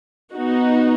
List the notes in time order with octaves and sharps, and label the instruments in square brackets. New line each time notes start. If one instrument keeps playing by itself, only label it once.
[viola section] B3 D#4 F#4